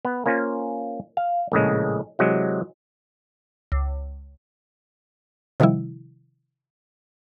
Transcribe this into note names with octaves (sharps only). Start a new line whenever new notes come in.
B3
A#3 C#4 F4 C5 G#5
F5
A#1 A2 C#3 G#3
C3 E3 F#3 G#3 C4
C#2
C3 D#3 F3 G3 E4